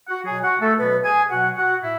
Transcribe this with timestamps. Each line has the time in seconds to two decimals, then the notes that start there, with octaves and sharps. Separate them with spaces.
0.08 F#4 F#5
0.25 B2 F#3 G#4 G#5
0.43 F#4 F#5
0.60 A3 A4
0.78 B2 F#3 B3 B4
1.04 G#4 G#5
1.30 B2 F#3 F#4 F#5
1.56 F#4 F#5
1.83 A2 E4 E5